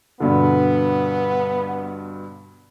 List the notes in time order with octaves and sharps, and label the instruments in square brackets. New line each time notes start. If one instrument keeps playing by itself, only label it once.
[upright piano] G2 B2 D3 [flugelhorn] B3